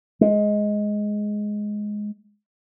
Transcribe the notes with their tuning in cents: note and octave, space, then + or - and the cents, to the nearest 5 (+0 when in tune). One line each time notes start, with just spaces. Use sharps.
G#3 +10